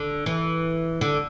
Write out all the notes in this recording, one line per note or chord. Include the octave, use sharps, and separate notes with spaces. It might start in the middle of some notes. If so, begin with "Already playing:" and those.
Already playing: D3
E3
D3